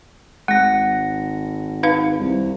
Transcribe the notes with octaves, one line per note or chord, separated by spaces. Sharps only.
G#1 G#3 F#5 A#6
D#4 B4 F5
C2